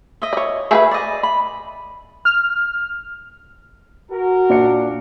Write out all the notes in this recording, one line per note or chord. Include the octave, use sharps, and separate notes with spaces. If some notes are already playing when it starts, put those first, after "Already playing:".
D#5 E5
C#5 D5
A3 G#4 A#4 B4 E5 C#6
D5 D#5
B5
F6
F#4 A#4
A#2 D4 C#7